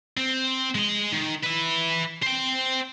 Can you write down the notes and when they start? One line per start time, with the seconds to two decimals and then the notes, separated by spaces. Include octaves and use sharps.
0.17 C4
0.75 G#3 D#5
1.12 D#3
1.43 B4 E5
2.23 C5 G5